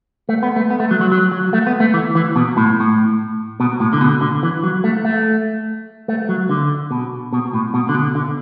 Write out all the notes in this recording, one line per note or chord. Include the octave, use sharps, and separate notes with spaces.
A3
B3
A3
B3
A3
F#3
F#3
F#3
F#3
A3
B3
A3
E3
E3
B2
A2
A2
B2
A2
D3
B2
D3
E3
F#3
A3
A3
A3
F#3
D3
B2
B2
A2
B2
D3
B2
D3